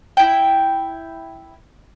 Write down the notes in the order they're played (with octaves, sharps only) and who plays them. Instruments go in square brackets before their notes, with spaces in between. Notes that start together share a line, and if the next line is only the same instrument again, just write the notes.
[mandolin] E4 G5